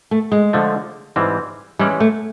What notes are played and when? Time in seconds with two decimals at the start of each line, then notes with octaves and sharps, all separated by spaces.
0.11 A3
0.32 G#3
0.53 D3 F3 A3
1.16 G#2 E3 G3 C4
1.79 E3 G3 G#3 C#4 E4
2.00 A3